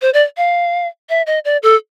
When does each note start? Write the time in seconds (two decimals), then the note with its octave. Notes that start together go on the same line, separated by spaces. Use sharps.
0.02 C5
0.14 D5
0.37 F5
1.09 E5
1.27 D#5
1.45 D5
1.63 A4